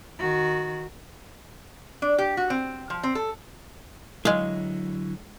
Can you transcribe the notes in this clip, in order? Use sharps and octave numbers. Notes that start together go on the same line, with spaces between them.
D#3 F#4
D4
G4
F#4
C4
F3
C4
A4
D3 F#3 G#3 E4 F5